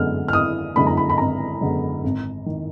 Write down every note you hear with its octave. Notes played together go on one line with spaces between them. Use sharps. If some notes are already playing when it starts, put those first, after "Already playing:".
Already playing: F#2 D3 G#3 B3 F6
F6
G#1 D#6
F#2 D3 G#3 B3 B5
A#5
B5
B5
G#1 A#5
F#2 D3 G#3 B3
G#1
D#3